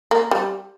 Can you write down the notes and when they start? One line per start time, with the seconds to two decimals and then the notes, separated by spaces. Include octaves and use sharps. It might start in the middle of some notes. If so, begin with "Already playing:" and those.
0.11 A#3
0.31 G3